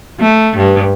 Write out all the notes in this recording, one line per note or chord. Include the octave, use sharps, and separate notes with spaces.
A3
G2